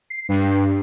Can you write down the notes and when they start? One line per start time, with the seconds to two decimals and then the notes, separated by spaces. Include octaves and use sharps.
0.10 C7
0.29 G2